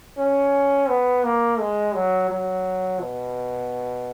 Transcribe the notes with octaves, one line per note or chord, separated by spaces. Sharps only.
C#4
B3
A#3
G#3
F#3
F#3
B2